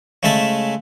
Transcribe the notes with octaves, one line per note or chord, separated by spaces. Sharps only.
C#3 G#3 A3 E5 A5